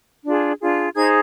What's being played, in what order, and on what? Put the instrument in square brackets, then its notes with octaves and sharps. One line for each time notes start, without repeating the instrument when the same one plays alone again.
[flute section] D4 F4 G#4
D4 F4 G#4
D#4 G#4 C5 G#6